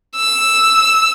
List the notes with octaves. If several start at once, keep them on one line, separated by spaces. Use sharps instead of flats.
E6